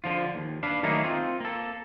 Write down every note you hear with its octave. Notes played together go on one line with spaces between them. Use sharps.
D3 F3 F4
D#2
D4 B4 F5
D#3 F#3 A3 A#3 D#4 G#4
C4 F4
A#3 A4